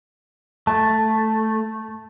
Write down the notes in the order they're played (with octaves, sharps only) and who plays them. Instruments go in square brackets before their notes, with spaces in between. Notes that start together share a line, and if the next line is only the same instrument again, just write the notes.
[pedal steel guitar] A3 [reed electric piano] A5